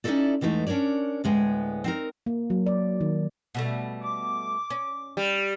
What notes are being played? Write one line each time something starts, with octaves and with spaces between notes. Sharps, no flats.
C#4 D#4 E4 F#4 A4 D5
E2 E3 G#3 A3 D#4
C#4 D4 A#4 C#5 D5
D2 A2 G#3 B3 G#5
C4 D#4 A#4
A#3
F#3
D5
D#3
B2 G3 A3
D6
C#4
G3